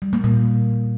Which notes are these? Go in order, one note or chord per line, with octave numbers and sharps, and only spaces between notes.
G3
A#3
A#2